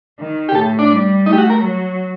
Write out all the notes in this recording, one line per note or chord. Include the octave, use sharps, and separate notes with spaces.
D#3
G4
A2 A4
D4
G3
A3 D#4
G4
F#4
A#4
F#3